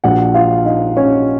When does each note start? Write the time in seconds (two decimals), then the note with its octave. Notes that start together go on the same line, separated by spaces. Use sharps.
0.04 A#1 A#2 F3 F#4 F#5
0.34 F4 F5
0.65 D#4 D#5
0.96 C#4 C#5